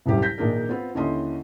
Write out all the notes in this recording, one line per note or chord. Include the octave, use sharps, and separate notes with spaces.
E1 C2 F#2 G3 G4
G6 A#6 B6
A#1 A#2 D#3 D4 G#4 A#4
B3 C4 F4
D#2 D3 C#4 E4 D#5 C6